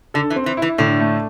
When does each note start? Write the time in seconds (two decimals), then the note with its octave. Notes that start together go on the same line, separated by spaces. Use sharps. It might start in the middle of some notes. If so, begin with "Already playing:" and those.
0.14 D3 A4
0.30 E3
0.36 C4
0.46 E3
0.57 E4
0.62 E3
0.78 A2 D3
1.00 A3